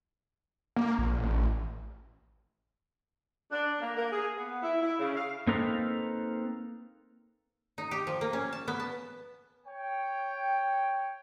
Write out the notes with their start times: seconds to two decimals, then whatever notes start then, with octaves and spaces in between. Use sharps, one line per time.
0.76 A#3
0.98 A#1
1.22 A1
3.51 D4
3.81 A#3
3.96 A#3
4.12 G#4
4.37 B3
4.62 E4
4.81 E4
4.99 C#3
5.16 F5
5.47 A#3 C4 D#4 A4 B4 F5
7.78 D#4
7.91 G4
8.07 F3
8.21 A#3
8.33 C#4
8.53 A5
8.68 B3
8.80 A5
9.66 C#5 G5